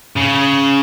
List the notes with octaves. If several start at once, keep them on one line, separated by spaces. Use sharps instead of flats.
C#3